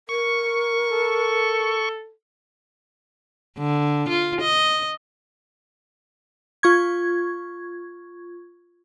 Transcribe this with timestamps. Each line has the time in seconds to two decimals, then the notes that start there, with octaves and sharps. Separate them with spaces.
0.09 A#4 C#6
0.91 A4
3.58 D3
4.09 F4
4.41 D#5
6.63 F4 C#6 G#6